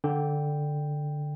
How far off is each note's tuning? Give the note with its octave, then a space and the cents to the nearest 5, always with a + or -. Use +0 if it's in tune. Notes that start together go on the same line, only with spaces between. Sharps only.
D3 +0 G5 +0